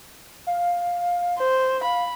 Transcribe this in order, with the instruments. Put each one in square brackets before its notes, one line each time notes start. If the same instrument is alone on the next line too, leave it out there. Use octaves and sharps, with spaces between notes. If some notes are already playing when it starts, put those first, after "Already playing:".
[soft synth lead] F5
[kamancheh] C5
[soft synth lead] F5 [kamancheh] B5